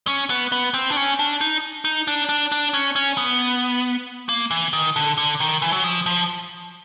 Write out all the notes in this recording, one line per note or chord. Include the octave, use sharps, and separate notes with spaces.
C#4
B3
B3
C4
D4
C#4
D4
D#4
D#4
D4
D4
D4
C#4
C#4
B3
A#3
E3
D#3
D3
D3
D#3
E3
F#3
F3
F3